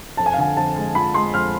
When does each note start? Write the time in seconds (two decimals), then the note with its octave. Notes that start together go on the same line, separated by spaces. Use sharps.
0.17 F2 A5
0.26 G#5
0.33 F5
0.38 D3 G#5
0.57 F2 A5
0.76 G#3
0.95 F3 B5
1.14 G#3 C6
1.34 F2 F6